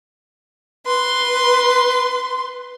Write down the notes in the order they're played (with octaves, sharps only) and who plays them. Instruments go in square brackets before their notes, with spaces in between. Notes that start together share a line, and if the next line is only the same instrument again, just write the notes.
[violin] B4 C6